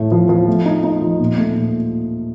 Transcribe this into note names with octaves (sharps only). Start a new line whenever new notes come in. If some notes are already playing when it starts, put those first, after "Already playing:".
Already playing: A2 A3
F3
F3
A3
D#4
D#4
F3
A#2
A3
A#2